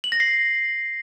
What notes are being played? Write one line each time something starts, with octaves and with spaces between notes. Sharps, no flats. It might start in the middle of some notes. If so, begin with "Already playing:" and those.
F#7
A#6
C7